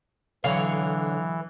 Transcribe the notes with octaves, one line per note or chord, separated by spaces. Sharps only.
B1 D3 E3 C#5 F5 A#5